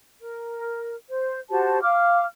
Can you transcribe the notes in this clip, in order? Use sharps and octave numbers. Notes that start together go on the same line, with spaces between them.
A#4
C5
F#4 G4 C5 A5
F5 D6 F6